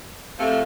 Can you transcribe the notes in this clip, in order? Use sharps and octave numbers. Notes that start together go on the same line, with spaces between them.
F2 C3 F3 A3